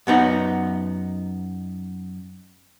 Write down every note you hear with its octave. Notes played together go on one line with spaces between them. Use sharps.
F#2 B3 D#4 F#5